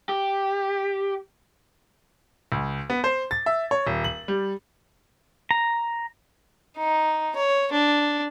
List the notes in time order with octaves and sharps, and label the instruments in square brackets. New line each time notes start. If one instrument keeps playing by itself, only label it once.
[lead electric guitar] G4
[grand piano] C#2
B3
C5
A6
E5
C#5
D#1
F#7
G3
[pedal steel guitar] A#5
[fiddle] D#4
C#5
D4